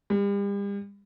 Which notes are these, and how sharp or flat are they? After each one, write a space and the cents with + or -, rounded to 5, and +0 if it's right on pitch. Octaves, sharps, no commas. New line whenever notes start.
G3 +40